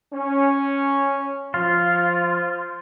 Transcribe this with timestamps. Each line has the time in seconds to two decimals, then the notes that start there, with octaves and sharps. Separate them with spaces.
0.12 C#4
1.54 F3 F4